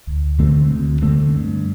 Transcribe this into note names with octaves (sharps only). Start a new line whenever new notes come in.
D2
D3 A3 C4
D2
D3 A3 C4
G2